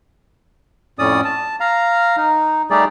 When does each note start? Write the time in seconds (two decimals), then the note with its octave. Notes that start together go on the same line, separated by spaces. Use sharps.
0.99 F2 A2 C#4 D5 D#6
1.25 A5
1.60 F5 A#5
2.17 D#4
2.71 G3 A3 D#4 G4 G#4 D5